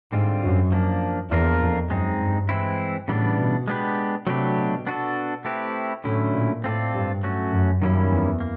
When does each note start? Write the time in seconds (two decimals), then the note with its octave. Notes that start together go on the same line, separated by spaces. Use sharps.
0.12 G#2 D3 G3 C4 F4
0.43 F#2
0.72 F3 A#3 D4
1.30 E2 F3 A#3 D4 F4 A#4
1.60 F2
1.90 F#2 G#3 C4 D#4
2.19 G2
2.49 E3 G#3 C4 E4
3.08 A2 C#3 E3 G3 B3 D4
3.38 B2
3.68 G#3 B3 D4 G4 B4
4.27 C3 F#3 A3 D4 G4 B4
4.56 B2
4.87 B3 D4 F#4 A4
5.45 A3 C4 E4 G4 B4
6.04 A2 D3 F#3 A3 C#4 E4
6.34 A#2
6.64 A2 C4 F4 A4 D5
6.93 G2
7.23 F#3 A3 C#4 F#4
7.52 F#2
7.81 F#2 D#3 G3 A#3 C#4 E4
8.11 E2
8.40 A#3